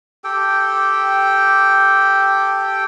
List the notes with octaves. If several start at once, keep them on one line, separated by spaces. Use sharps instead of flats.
G4 A4 G5